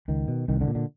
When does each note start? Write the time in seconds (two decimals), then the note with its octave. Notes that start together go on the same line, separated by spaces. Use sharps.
0.08 C#2 D#3
0.28 B2
0.48 C2 D#3
0.61 D3
0.68 A#2
0.75 D3